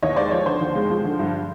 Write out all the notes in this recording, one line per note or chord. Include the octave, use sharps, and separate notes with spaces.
D#2 C#5 D#5
G#3 C5 D5
F3 C#5
D3 C5
D#2
G#3
F3
D3
G2